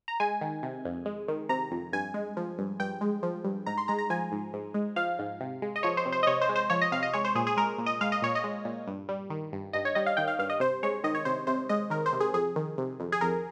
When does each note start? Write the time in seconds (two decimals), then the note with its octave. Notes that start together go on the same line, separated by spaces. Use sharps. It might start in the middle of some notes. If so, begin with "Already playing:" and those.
0.08 A#5
0.20 G#3 G#5
0.41 D#3
0.63 C3
0.85 F2
1.06 G#3
1.28 D#3
1.49 C3 A#5
1.71 F2
1.93 G2 G#5
2.14 G#3
2.37 F3
2.59 G2
2.80 G2 G5
3.01 G#3
3.23 F3
3.44 G2
3.66 G#2 A#5
3.78 C6
3.88 G#3 A#5
3.99 A#5
4.10 F3 G#5
4.32 G#2
4.53 G#2
4.74 G#3
4.96 F3 F5
5.19 G#2
5.40 C3
5.62 G#3
5.76 D#5
5.83 F3 C#5
5.97 C5
6.06 C3
6.12 C5
6.23 D#5
6.27 C3 C#5
6.41 C5
6.49 G#3
6.56 C5
6.70 F3 C#5
6.82 D#5
6.92 C3 F5
7.03 D#5
7.13 G#3 C#5
7.25 C5
7.35 A#2 G#4
7.47 G#4
7.57 G#3 A#4
7.78 A#2
7.86 D#5
8.01 G#3 F5
8.12 D#5
8.22 A#2 C#5
8.35 D#5
8.44 G#3
8.65 A#2
8.87 G2
9.09 G3
9.30 D#3
9.53 G2
9.73 G2 D#5
9.85 C#5
9.95 G3 D#5
10.06 F5
10.17 D#3 G5
10.28 F5
10.39 G2 F5
10.50 D#5
10.60 C3 C5
10.83 G#3 C#5
11.04 D#3 D#5
11.15 C#5
11.25 C3 C5
11.47 C3 C5
11.69 G#3 D#5
11.90 D#3 A#4
12.06 C5
12.13 C3
12.20 G#4
12.34 F2 G#4
12.56 D#3
12.78 C3
13.00 F2
13.12 G#4
13.21 F2 A#4